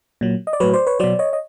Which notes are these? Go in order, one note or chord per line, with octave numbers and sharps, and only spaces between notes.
A#2 F#3
D#5
D5
A2 F#3 B4 C#5
C5 D5
B4 C#5
B2 F#3 C5 D5
C#5 D#5
D#5